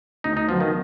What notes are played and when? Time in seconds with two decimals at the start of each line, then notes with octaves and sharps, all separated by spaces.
0.24 D2 D#4
0.37 D#4
0.48 D3 F3 F#3 B3
0.61 D#3